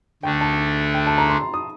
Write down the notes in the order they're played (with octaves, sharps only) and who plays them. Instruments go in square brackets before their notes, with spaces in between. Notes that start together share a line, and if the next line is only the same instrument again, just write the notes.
[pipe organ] D2 D3 A3 D4 [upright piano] G5
[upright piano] A5
G5
A5
A#5
C6
C6
D#6